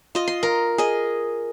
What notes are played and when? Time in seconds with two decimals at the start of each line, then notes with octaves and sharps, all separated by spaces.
0.15 F4 D#5
0.28 C6
0.43 A#4
0.78 G#4 D#5